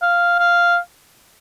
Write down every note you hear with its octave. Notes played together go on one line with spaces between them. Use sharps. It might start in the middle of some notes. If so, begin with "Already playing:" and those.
F5
F5